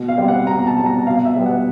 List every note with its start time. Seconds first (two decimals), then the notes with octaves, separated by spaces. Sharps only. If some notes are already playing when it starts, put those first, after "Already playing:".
Already playing: B2
0.08 F5
0.18 G3 C4
0.28 F#5
0.47 B2 A#5
0.67 A5
0.77 G3 C4
0.86 A#5
1.06 B2 F5
1.25 E5
1.36 G3 B3
1.46 F#5